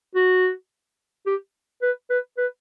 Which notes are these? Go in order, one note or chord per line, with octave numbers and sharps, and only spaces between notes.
F#4
G4
B4
B4
B4